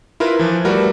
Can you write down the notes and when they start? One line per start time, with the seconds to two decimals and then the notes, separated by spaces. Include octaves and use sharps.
0.20 E4 F4 A#4 B4
0.39 E3 F3
0.65 G3 A3 F#4 A#4 B4